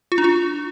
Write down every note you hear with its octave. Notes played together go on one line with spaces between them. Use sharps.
F4
D4
F4